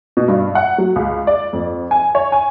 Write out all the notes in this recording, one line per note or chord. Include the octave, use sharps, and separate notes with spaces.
B2
G2
F#5
F#3
C#2
D5
F2
G#5
C#5
G#5